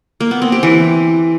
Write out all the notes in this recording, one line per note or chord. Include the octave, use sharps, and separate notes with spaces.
A#3
B3
C4
G4
E3